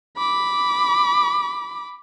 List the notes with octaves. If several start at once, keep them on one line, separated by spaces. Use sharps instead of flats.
B5 D6